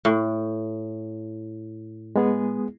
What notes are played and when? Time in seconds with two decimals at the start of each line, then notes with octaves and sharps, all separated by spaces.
0.05 A2
2.16 G#3 B3 G#4